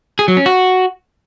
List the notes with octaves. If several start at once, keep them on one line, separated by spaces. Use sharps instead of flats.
G#4
F#3
C#4
F#4